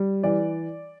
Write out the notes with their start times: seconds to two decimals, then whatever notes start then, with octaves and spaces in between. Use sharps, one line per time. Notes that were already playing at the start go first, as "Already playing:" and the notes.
Already playing: G3
0.23 E3 D5